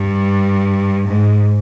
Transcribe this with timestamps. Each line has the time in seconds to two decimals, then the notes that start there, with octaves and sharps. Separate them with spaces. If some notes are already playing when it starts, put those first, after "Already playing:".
Already playing: G2
1.08 G#2